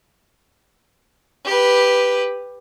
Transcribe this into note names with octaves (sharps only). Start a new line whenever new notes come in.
G4 B4